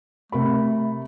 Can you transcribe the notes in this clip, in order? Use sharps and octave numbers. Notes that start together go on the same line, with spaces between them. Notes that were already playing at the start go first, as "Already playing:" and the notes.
C3 A3 A#4 B5